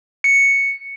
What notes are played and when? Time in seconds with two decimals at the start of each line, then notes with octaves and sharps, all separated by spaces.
0.24 C#7